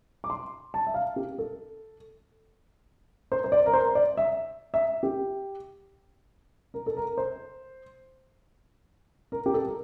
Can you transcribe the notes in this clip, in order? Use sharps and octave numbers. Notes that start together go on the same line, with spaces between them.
D6
C6
A5
E5
F5
G4
A4
C5
C5
D5
A#4
C5
D5
E5
E5
G4
A#4
A4
A#4
C5
A#4
G4
A4
A#4